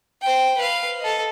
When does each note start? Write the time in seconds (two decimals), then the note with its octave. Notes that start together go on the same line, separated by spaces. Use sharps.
0.21 C5 G5
0.58 B4 F5
1.00 A4 D#5